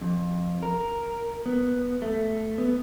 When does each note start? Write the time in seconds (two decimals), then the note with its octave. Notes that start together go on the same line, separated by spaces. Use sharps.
0.01 F2
0.63 A#4
1.46 B3
2.02 A3
2.58 B3